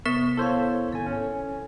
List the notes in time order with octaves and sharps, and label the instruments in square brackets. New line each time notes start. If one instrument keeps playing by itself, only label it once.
[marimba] C3 [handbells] B3 A#4 B6
[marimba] E4 F5 [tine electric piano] A4 C5 C#5
[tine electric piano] G#1 G#5 [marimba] A4
[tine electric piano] C#4